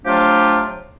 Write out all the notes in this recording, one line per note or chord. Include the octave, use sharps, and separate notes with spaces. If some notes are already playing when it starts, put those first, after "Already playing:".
F3 F#3 A3 D4 F4 G4